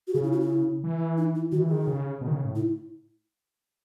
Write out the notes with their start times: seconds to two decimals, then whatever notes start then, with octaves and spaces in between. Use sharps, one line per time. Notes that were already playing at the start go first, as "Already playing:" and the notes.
0.08 F#4
0.14 C#3 G#4
0.23 E4
0.32 F#4
0.40 E4
0.84 E3
1.17 D#4
1.35 E4
1.52 D#3 F#4
1.61 E3
1.70 D#3 G#4
1.87 C#3
2.21 B2
2.27 D#3
2.33 C#3
2.45 A2
2.55 E4